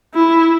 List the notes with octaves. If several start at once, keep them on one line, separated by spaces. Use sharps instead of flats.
E4